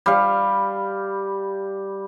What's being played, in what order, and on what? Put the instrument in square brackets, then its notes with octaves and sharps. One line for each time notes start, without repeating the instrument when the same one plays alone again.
[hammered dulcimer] G3 F5